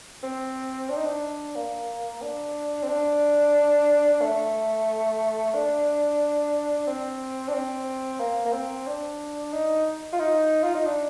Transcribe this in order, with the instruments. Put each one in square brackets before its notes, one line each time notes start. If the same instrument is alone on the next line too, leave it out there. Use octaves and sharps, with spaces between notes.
[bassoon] C4
D4
D#4
D4
A#3
D4
C4
D4
A3
D4
C4
D4
C4
A#3
A#3
C4
D4
D#4
F4
D#4
F4
D#4
D4